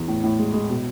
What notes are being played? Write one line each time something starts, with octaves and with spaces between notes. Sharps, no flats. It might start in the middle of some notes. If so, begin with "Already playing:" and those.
Already playing: E2
A2
A2
G#3
G#3
B2